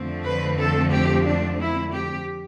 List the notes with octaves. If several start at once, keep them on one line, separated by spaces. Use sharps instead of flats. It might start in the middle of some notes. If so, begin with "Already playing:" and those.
Already playing: F2 D3 F3 A3 C4
B4
A4
G4
D4
E4
G4